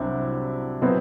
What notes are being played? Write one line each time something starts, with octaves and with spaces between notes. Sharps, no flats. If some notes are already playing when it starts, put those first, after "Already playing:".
Already playing: C2 C3 F#3 C4 D4 E4
B2 F#3 B3 C4 E4